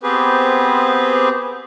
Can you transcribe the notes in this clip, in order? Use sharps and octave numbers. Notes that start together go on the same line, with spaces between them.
B3 C4 G4 G#4 B4 C5